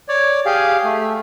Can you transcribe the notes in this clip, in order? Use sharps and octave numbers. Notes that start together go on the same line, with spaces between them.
C#5 D5
G4 G#4 F5
A3